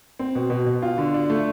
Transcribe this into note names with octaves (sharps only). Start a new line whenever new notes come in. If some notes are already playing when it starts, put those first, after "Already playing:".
C4
B2
B2
B2
F4
D3
D4
A3